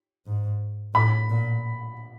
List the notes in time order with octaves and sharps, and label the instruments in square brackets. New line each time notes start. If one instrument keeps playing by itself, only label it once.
[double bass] G#2
[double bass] A2 [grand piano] B5
[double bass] A#2